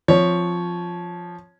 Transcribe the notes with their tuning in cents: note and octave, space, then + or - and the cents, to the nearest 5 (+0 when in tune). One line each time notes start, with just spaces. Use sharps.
F3 +0 C4 +0 C#5 +0